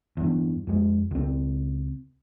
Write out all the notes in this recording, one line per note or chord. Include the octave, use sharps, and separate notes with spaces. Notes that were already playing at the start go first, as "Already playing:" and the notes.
E2 G2
F2 G#3
C#2 C4